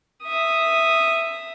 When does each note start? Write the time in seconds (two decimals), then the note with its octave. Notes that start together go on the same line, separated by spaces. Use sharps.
0.24 E5 D#6